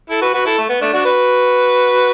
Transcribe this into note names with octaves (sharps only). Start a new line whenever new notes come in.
E4 A4
F#4 B4
F#4 B4
E4 A4
A3
B3
A3 D4
D4 F#4
F#4 B4